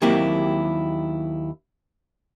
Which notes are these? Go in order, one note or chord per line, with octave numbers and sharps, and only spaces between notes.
D#2 F#3 A#3 C4 E4 G4